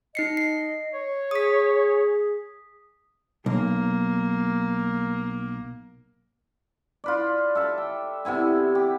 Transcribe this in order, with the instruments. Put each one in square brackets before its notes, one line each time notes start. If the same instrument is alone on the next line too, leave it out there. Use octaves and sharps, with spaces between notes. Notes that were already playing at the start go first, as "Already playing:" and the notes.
[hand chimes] D#4 C7 C#7 [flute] D#5
[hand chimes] C7
[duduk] C#5
[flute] G#4 [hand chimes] D#6 B6
[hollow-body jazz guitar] B1 [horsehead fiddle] A#3
[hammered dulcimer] F4 B4 D5
A4 E5 A5
G5
C3 B3 E4 G#5
G4